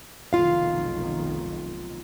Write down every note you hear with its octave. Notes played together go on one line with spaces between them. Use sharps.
F1 B1 D#3 F4 F5